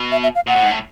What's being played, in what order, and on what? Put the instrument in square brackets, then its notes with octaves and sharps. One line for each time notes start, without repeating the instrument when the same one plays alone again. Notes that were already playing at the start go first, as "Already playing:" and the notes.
Already playing: [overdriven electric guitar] B2
[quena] E5
E5
F5
[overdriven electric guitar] A#2 [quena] F#5
[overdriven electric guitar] A2
G#2
A2